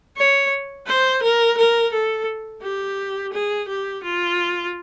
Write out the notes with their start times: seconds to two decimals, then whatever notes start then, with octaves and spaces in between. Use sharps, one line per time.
0.17 C#5
0.87 C5
1.23 A#4
1.57 A#4
1.93 A4
2.62 G4
3.33 G#4
3.68 G4
4.03 F4